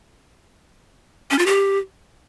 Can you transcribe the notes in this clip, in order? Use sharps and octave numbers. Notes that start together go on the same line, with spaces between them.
C#4
F4
G4